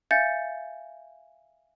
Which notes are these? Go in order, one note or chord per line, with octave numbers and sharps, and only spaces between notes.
E5 F5 G#5 G6 A6 C#7